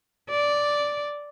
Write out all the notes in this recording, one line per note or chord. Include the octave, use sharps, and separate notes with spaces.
D5